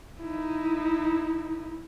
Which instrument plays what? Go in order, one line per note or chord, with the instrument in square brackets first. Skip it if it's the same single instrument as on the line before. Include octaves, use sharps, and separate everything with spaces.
[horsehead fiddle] D#4 E4